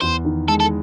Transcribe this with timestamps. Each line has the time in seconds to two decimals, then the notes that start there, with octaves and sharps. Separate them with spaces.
0.01 E2 C5
0.25 D#3
0.48 G#3 A4
0.60 A4